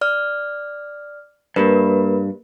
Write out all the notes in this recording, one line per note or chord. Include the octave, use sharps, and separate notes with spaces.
D5 F6
G2 A#3 A#4 B4